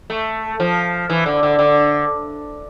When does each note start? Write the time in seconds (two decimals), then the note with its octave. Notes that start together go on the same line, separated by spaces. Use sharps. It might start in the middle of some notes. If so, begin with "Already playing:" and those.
0.10 A3
0.60 F3
1.10 E3
1.26 D3
1.43 D3
1.59 D3